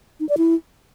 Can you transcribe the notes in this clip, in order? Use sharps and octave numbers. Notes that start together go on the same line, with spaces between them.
D#4
D5
E4